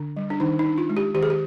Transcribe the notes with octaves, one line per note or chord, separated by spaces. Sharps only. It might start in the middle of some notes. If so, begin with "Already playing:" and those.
Already playing: D3 D4
G3
D4
D#3 D#4
D#4
D4
F4
G#3
G4
D#3 G4
G#4
G4